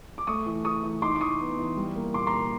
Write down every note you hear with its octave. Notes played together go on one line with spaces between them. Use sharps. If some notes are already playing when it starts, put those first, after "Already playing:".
D6
A3 C#6 D#6
E3
E3 C#6 D#6
E3
D#4 C6 D6
D6
E3 C#6 D#6
B3
E3
G3
A#3
A#2 C6 D6
A#5 C6
A#3